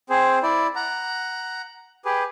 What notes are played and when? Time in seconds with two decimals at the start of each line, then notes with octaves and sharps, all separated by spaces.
0.10 C4 G#4 C5
0.43 E4 D5
0.76 F#5 A#5
2.05 G4 G#4 B4